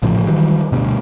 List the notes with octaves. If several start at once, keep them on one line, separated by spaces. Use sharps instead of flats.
A1 A2 C#3 F3
D#3 E3 F#3 G3
D2 G2 B2